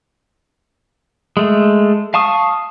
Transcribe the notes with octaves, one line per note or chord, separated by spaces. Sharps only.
G#3 A3
F5 A5 C#6 D#6